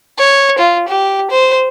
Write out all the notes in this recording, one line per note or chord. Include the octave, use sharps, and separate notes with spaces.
C#5
F4
G4
C5